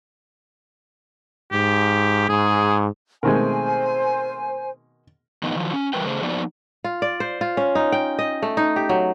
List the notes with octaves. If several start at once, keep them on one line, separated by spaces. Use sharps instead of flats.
G#2 G4
G#2 G#4
B2 D#3 G#3 A3 C4 A#4 C5 G#5
A2 D#3 F3 B3 D#4 D#5
D#3 F3 F#3
C#4
E3 G3 A#4 B4 G5
C#3 A3 G#4 C5
F3 A#3 B3 D#4 F#4 D5
F4
D5
C5
F4
C#4
D#4
G5
D#5
A3
D#4
G4
F#3